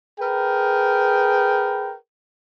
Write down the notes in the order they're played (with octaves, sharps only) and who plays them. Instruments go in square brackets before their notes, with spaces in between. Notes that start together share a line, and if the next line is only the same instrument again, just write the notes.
[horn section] G#4 A#4 B4 G5